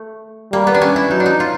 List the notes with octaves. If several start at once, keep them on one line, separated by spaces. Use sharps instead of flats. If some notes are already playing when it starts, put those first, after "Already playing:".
Already playing: A3
G3 A#3
B3
D4
C#4
E4
F#3 D#4
D4
D#4
F4